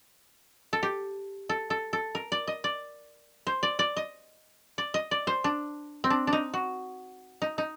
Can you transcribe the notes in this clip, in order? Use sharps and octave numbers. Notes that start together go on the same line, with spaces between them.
A4
G4
A4
A4
A4
A#4
D5
D#5
D5
C5
D5
D5
D#5
D5
D#5
D5
C5
D4
C4
D4
D4
D#4
F#4
D#4
D#4